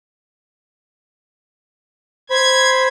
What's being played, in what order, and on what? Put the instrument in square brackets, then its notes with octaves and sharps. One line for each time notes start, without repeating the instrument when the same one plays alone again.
[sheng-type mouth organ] C5 B5 [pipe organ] G#6